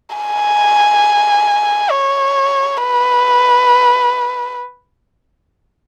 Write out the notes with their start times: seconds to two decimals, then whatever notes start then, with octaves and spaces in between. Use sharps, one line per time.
0.16 G#5
1.90 C#5
2.77 B4